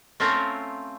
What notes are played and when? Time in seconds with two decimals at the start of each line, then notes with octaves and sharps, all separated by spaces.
0.20 A3 C4 C#4 F4 A#4 C#5